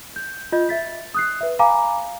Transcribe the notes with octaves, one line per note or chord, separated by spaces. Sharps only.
G6
F4 D#5 G6
E5 A6 B6
D#6 F#6 C7
B4 E5
F5 G#5 A#5 B5 D6